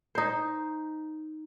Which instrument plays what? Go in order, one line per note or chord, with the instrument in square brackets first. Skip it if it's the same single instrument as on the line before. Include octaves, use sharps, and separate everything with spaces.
[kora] D#4 C5